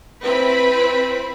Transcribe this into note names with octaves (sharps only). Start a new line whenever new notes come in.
C4 E4 B4 B5